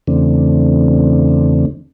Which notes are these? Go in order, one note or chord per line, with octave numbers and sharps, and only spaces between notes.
E2 C#3 E3 A3 C4 D4